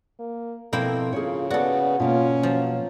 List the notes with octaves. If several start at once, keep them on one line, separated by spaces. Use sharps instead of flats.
A#3
B2 F3 A#3 C4 E4 A4 G5
C#3 F4 G#4 A#4 C#5
B3 F#4 A4 D5
B2 A#3 C#4 F4
F3 F#3